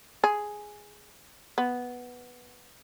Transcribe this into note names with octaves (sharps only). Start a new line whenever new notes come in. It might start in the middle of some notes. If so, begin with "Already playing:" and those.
G#4
B3